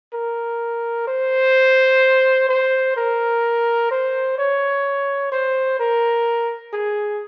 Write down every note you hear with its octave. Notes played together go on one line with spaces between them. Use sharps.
A#4
C5
C5
A#4
C5
C#5
C5
A#4
G#4